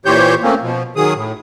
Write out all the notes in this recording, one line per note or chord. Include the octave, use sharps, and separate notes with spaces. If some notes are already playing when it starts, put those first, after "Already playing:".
A#2 E3 G4 C5 C#5 G6
A3 A#3 C4 C#4
B2 F3
D#3 F#3 G#4 D#6
A2